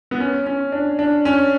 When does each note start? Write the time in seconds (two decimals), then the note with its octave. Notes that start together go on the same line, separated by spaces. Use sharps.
0.11 B3
0.20 C#4
0.46 C#4
0.72 D4
0.99 D4
1.25 C#4